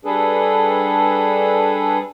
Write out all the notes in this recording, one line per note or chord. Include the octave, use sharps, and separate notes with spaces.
G3 D4 G#4 A4 B4